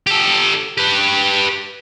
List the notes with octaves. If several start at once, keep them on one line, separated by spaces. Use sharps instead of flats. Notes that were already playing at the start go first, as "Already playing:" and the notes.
G4 A4
G4 B4